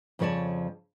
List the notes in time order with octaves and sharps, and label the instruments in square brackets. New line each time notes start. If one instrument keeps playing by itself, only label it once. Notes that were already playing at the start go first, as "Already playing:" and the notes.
[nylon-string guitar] F2 C#3 F3 C#5 D5 A5